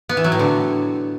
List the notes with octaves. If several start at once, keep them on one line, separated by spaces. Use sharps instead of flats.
B3
E3
F#3
A2
D3